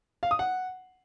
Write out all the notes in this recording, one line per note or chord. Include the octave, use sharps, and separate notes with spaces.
F5
D#6
F#5